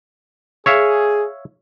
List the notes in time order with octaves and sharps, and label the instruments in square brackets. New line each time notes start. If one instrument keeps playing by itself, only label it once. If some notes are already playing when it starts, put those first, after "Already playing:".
[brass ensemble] G#4 [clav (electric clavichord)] C#5 E5 F5